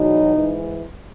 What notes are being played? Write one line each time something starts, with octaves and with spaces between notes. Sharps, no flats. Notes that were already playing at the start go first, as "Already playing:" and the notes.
Already playing: E2 B2 F#3 D#4
G#2 E3